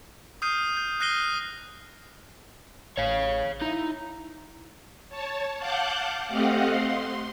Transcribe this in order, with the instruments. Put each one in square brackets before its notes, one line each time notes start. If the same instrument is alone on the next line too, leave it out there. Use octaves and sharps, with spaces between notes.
[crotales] D#6 F6 G6 C7 D#7
G6
F6 F#6 A#6 C7 D#7 G7
[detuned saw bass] A1 [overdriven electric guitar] C#5 F5
[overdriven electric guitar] D#4 [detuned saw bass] E4
[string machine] C#5 A5
F5 F#5 A5 D6 F#6 G6
A3 C4 G4 D#5 F5 F#5
C6